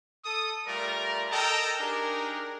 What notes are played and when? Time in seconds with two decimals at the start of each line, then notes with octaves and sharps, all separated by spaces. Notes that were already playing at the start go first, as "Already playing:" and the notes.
0.25 A4 D#6
0.67 G3 A3 F4 A#4 D5 A#5
1.31 A4 A#4 D#5 G5 A5 A#5
1.80 D4 D#4 G4 G#4 A#4